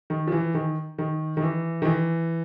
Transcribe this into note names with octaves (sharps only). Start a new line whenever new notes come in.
D#3
F3
E3
D#3
D#3
D#3
E3
D#3
E3